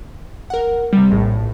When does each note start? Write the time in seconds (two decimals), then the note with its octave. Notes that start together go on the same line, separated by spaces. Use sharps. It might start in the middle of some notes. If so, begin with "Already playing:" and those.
0.50 A#4 F#5
0.93 C3 G3
1.11 A#1 A2